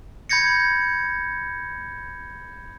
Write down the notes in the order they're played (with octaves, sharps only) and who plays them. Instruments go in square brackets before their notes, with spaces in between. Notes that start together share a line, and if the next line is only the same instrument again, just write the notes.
[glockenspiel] B5 G6 G#6 A#6 C#7